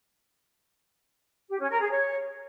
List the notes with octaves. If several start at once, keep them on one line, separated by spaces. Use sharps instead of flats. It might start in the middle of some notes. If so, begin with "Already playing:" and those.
G4
C#4
A#4
G#4
C#5